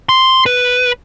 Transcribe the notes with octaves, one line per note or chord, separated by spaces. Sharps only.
C6
B4